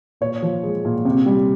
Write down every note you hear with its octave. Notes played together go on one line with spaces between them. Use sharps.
A#2 C#5
F3
G#3
A#2
C3
G3